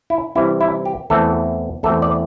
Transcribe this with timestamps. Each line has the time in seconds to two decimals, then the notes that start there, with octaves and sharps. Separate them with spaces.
0.10 E4
0.35 C3 E3 G3 C4 E4
0.61 E4
0.85 G4
1.10 E2 E3 A3 C4 A4
1.83 E2 E3 A3 C4 A4
2.02 D5